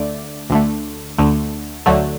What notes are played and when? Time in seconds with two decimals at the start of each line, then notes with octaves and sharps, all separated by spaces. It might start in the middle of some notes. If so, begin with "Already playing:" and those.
Already playing: D2 D3 A3 D5
0.50 D2 D3 A3
1.18 D2 D3 A3
1.86 D2 D3 F#3 A3